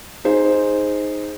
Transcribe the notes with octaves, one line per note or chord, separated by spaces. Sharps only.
D#4 G#4 C5